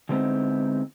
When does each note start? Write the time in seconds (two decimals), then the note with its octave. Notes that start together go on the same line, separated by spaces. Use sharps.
0.09 D3 G#3 B3 C4 D#4 E4